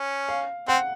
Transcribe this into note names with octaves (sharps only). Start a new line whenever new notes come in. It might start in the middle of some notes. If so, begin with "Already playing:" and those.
Already playing: C#4
F5
C4 F#5